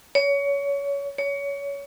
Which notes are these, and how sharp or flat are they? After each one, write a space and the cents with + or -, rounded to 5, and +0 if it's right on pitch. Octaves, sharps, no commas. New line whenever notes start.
C#5 +25
C#5 +25